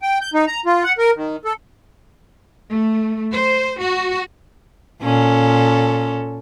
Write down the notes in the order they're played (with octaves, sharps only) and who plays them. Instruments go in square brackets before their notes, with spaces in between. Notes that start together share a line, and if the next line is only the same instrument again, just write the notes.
[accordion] G5
G6
D#4
A#5
F4
F#5
A#4
D#3
A4
[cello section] A3
C5
F#4
[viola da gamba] A#2 C#4 A4